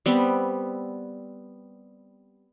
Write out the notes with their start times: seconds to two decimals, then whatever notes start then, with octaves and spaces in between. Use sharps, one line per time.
0.06 G3 B3 C4